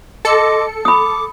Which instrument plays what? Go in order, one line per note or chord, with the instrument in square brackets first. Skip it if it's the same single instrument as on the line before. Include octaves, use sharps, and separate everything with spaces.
[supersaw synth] A4 C#7 [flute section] D#5 C6 D6
[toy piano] B5 D#6 [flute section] D6